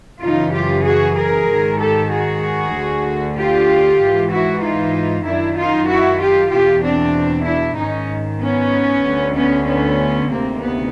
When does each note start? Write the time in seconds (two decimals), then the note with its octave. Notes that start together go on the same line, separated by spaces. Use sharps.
0.21 F#2 C#3 E3 D#4 F4
0.53 F4 G4
0.84 F#4 G#4
1.15 G#4 A#4
1.47 G#2 D#3
1.78 G4 A4
2.11 F#4 G#4
2.73 D2 D3
3.36 F4 G4
4.00 G#2 E3
4.31 E4 F#4
4.62 D#4 F4
5.25 F#2 D#3 D4 E4
5.58 D#4 F4
5.88 E4 F#4
6.20 F4 G4
6.51 E2 B2 F4 G4
6.83 C4 D4
7.46 D4 E4
7.77 G#2 D#3 C#4 D#4
8.40 B3 C#4
9.04 D2 D3
9.35 B3 C#4
9.66 B3 C#4
10.29 D2 C3 D#3 A#3 C4
10.61 B3